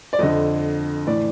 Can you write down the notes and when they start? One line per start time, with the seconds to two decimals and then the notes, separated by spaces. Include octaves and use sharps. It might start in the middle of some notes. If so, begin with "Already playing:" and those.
0.13 D5
0.19 F2 D3 D#5
1.07 A2 E3 D5